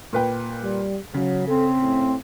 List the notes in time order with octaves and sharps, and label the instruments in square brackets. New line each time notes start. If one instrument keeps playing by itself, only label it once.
[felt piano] A#2 B4 G5
[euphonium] G3
[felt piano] C#3 [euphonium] F#3
[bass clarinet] C4 [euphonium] A4
[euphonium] A2